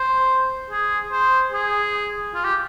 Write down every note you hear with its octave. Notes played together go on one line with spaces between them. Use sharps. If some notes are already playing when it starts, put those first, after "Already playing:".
Already playing: C5
G#4
C5
G#4
F4
G4